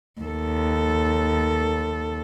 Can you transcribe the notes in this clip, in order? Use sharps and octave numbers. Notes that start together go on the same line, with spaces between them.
D#2 A4